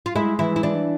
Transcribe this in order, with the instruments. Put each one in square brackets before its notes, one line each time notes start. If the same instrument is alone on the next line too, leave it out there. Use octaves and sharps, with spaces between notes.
[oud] F4
[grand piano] G#3 [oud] E4
[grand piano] E3 [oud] E4
[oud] E4
[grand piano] E3 [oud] D4